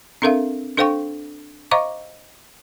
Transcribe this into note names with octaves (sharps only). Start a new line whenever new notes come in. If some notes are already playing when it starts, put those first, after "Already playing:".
C4 D4 A4 A#4 E5 F5
D4 A4 C5 F5 G5 C#6
C5 D#5 F5 A#5 C#6 D6